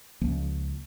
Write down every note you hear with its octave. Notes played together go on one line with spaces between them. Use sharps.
C#2 F3 A#3